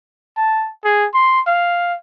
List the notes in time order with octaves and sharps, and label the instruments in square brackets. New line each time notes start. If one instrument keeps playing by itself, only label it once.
[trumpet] A5
G#4
C6
F5